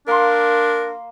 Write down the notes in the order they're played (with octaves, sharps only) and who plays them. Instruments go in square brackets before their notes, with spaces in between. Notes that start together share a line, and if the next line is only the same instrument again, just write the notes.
[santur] A#3 C6 [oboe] D4 [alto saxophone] A#4